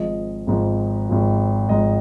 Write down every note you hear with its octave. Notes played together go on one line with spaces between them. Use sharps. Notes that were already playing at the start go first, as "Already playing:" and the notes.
Already playing: G#1 G#2 F3 D#5
G#1 G#2 F3
G#1 G#2 F3
G#1 G#2 F3 D#5